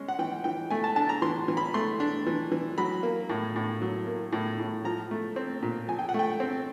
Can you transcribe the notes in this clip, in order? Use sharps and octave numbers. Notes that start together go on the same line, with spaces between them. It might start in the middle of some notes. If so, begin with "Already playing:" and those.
Already playing: G#3 C#4
F#5
E3 G5
E3 G5
A3 G#5
A5
D4 A5
A#5
E3 C6
E3
B5
A3 C6
D4
E3
E3
F#3 B5
A#3
A2
A2
F#3
A#3
A2
A2
F3 A#5
A3
C4
A#2
F3 G#5
G5
F#5
A3
G5
C4